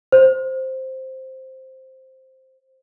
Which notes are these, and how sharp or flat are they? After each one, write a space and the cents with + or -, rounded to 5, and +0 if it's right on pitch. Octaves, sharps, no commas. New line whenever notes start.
C5 +5